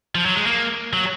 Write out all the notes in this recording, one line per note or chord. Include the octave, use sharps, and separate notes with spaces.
F3
F#3
G#3
A#3
F#3